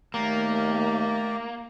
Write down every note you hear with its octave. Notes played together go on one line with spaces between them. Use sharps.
D#2 A3 A#3 G4 D5 A#5